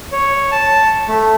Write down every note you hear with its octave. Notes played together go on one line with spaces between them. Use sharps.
C#5
A5
A3